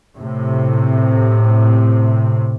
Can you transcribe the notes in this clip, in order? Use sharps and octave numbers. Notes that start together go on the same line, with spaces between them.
A2 C3